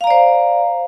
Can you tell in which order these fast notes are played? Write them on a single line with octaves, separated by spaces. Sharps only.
F5 A#5 D5 C5